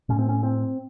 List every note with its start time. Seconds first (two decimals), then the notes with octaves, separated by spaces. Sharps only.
0.09 A2 C#4
0.19 C4
0.29 C#4
0.43 C4